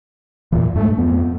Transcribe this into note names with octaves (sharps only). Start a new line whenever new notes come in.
E2 A#2 E3
G2 G#3 A3
F2 B3